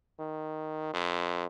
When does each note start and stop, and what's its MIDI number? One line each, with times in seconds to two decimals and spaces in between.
0.19 0.93 51
0.94 1.45 41